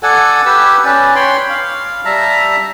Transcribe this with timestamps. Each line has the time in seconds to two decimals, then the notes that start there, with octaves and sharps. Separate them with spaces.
0.03 A4 D5 F#5 G#5
0.46 G4 B4 E6
0.85 C#4 B4 D5
1.15 C#5 G5 B5 C6
1.49 F5
2.05 G3 E5 A5 A#5